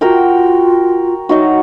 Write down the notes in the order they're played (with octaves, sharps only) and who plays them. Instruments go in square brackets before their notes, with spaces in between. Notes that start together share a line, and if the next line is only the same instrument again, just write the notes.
[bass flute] F4 [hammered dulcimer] F#4 A#4 G5
[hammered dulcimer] F#3 D#4 F#4